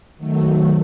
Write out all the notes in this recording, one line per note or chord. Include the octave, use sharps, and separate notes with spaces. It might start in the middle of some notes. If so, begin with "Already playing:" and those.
D#3 F#3 A3